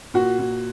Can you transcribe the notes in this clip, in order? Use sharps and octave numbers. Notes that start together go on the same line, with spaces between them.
A#2 F#4
A#2